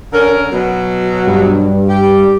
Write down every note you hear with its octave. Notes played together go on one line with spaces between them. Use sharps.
D3 C#4 A#4
B2 F#3
G2
G4